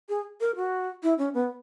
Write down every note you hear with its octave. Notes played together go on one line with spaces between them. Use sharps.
G#4
A#4
F#4
E4
C#4
B3